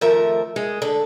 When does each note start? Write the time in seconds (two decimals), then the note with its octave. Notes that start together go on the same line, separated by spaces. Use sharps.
0.01 F2 D#3 F3 A3 A#4 E5
0.56 G#3
0.82 D3 A4